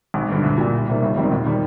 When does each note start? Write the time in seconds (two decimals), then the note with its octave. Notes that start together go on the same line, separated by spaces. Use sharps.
0.14 G#1
0.29 G2 D3
0.43 C2
0.58 A#2 G3
0.73 C2
0.88 C3 G3 A#3
1.02 G1
1.16 F2 D#3 G3 C4
1.31 D#2
1.46 D#3 G3